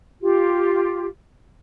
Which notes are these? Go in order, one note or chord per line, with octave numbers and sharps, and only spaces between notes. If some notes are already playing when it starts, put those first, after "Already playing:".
F4 G4